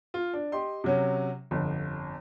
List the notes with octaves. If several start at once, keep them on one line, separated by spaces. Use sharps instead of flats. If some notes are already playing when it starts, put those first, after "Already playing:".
F4
D4
G4 D#5 C6
C3 F#3 C#4
G1 F2